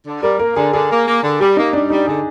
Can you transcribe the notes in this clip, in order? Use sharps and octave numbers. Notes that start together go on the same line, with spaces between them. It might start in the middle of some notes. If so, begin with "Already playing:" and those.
D3
G3 A#4
A#3 A#4
D3 G#4
D3 G#4
A#3
A#3
D3
G3 G4
A#3 D#4
G3 D4
G3 D#4
D3 G#4